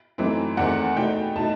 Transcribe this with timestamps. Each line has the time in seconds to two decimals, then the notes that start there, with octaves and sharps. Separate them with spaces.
0.18 F#2 E3 A3 C4 D#4
0.57 E2 D#3 A3 C4 F#5
0.96 B2 A3 D#4 G5
1.36 B2 A3 D#4 A5